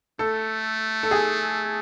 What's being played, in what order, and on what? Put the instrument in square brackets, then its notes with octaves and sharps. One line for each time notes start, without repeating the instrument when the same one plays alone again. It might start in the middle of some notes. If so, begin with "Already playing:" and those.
[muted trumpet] A3 [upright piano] A4
[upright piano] A4
G#4